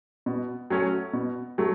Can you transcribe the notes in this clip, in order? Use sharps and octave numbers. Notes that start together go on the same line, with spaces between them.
B2
F#3 A3 C#4
B2
F#3 A3